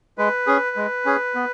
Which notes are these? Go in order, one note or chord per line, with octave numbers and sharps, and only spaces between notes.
G#3 B4
C#4 G#4
G#3
C#4 G#4
B3